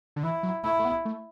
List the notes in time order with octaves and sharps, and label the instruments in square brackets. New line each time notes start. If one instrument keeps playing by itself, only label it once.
[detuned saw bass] D3
[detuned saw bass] E3 [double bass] E4
[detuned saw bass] F#3
[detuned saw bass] A3 [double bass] E4
[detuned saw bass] A3
B3
A3